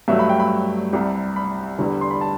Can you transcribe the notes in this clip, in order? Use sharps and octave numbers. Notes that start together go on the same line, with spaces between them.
G2 F#3 A3 E5
B5
G5
B5
C2 C3 G3
B5
E2 D3 G3
C6
B5
A5